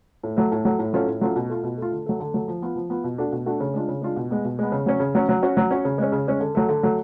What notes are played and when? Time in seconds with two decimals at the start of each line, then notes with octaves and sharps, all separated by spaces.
0.23 A2
0.37 F#3 A3
0.52 A2
0.65 F#3 A3
0.79 A2
0.93 F#3 A3 C#4 F4
1.07 A2
1.21 F#3 A3 C#4 F4
1.36 B2
1.49 A3 F4
1.63 B2
1.78 A3 F4
1.92 D3
2.06 F#3 A3
2.20 D3
2.34 F#3 A3
2.48 F3
2.62 B3 F4
2.76 F3
2.90 B3 F4
3.04 B2
3.18 A3 D4 F#4
3.32 B2
3.46 A3 D4 F#4
3.60 C#3
3.74 G#3 D4 F4
3.88 C#3
4.02 G#3 D4 F4
4.16 B2
4.31 G#3 B3
4.45 B2
4.59 G#3 B3
4.72 C#3
4.86 F#3 C#4
5.00 C#3
5.15 F#3 C#4
5.29 F#3
5.42 C#4 F#4
5.57 F#3
5.71 C#4 F#4
5.85 C#3
5.98 G#3 C#4
6.12 C#3
6.27 G#3 C#4
6.40 D3
6.55 F#3 A3
6.69 D3
6.83 F#3 A3